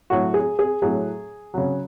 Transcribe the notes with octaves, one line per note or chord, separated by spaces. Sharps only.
A2 F#3 F#4
G#4
G#4
A2 F#3 G#4
C#3 F#3